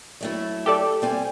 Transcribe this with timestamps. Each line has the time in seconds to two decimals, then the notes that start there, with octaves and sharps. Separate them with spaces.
0.21 F#3 A3 E4
0.66 G4 A4 D5
1.02 G3 C4 G#5